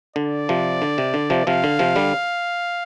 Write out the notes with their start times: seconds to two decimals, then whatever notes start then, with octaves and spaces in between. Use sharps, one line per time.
0.16 D3 D5
0.49 C3 F3
0.82 D3
0.98 C3
1.14 D3
1.30 C3 F3
1.47 C3 F3 F5
1.64 D3
1.79 C3 F3
1.96 D3 G3